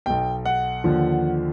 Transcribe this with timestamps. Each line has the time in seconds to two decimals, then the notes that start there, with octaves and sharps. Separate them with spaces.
0.06 B1 B2 G5
0.45 F#5
0.84 D#2 D3 F3